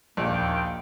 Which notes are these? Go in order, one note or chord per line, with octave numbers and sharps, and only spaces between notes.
A#1 D#2 G5